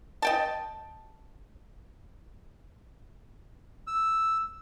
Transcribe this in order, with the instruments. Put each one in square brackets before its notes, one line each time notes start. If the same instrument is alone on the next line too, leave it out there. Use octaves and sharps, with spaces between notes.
[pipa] D#5 G5 A5
[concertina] E6